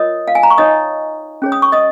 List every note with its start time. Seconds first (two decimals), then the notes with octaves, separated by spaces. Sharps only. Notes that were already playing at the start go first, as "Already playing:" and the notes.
Already playing: F4 A#4 C#5 D#5 D#6
0.28 F5
0.35 G#5
0.43 A#5
0.50 C#6
0.58 D#4 C#5 D#5 D#6
1.42 C#4 G#4 C#5
1.52 D#6
1.62 C#6
1.72 D#5 D#6